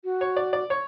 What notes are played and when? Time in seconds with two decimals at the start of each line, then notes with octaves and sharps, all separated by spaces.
0.04 F#4
0.21 C#5
0.37 D5
0.53 D5
0.70 C#5